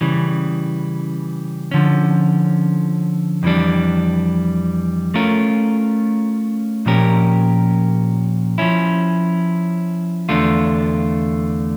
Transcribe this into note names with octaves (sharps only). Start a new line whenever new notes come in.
C#3 E3 G3
D3 F3 C#4
F2 E3 G3 D4
A3 C#4 F4 A#4
A#2 F3 C#4 G4 A#4
F3 C#4 E4
E2 D3 A3 D4 F4